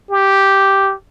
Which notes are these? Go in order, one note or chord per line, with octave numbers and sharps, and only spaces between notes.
G4